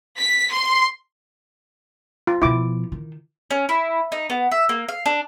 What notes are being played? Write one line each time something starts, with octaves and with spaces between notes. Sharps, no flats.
B6
C6
F4
B2 F3 E4 D6
D#3
C#4
E4
D#4
B3
E5
A#3
F5
D4